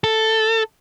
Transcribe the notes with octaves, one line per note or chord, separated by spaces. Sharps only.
A4